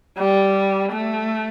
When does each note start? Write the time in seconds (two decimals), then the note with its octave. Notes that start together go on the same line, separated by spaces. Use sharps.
0.18 G3
0.92 A3